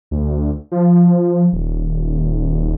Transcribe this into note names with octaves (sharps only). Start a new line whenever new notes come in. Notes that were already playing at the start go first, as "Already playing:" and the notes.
D2
F3
D#1